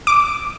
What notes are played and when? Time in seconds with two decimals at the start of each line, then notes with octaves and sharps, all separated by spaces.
0.07 D6